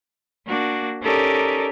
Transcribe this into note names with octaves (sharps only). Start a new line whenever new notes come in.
A#3 D4 F#4
C#4 D#4 G4 A4 A#4 D5